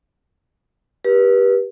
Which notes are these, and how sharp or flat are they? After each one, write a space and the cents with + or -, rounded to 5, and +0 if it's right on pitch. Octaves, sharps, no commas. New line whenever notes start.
G4 +0 B4 -30